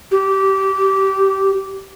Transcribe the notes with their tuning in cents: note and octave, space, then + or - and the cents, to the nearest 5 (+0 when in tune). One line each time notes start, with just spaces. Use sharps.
G4 -20